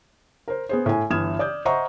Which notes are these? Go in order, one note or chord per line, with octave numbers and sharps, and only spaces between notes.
A#4 C5
B3 G#4 C5
A2 G#5
G1 E3 D#6 F6 G#6 E7
D5 D#6 G6
C5 D#5 E5 F#5 A#5 C#6